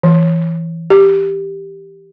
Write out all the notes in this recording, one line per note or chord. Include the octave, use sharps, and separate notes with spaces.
E3
G4